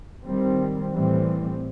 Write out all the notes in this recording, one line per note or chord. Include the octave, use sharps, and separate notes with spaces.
D#3 G3 C4
A2 E3 G3 C4